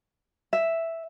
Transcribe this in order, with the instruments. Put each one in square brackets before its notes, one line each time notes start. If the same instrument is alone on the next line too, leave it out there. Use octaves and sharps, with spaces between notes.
[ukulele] E5